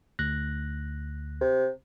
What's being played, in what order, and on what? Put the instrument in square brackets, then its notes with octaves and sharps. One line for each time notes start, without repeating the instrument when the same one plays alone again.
[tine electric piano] D2 F#6 A#6
[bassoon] C3